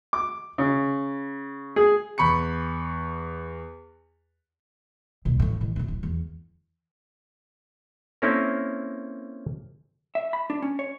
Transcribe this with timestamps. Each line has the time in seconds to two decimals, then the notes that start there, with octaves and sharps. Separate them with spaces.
0.13 D6
0.58 C#3
1.76 G#4
2.18 E2 B5 C#6 C#7
5.25 D#1 B1
5.40 A1 A2
5.61 A1 F#2
5.76 A#1 F#2
5.88 D1
6.03 E2
8.22 A#3 C4 C#4 E4 A4 A#4
10.15 E5
10.33 B5
10.50 D4
10.62 C#4
10.79 C#5